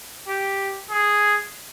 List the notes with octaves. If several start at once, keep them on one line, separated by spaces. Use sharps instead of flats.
G4
G#4